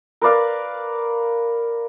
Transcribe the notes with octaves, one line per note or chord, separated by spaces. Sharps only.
A#4 B4 D5 F5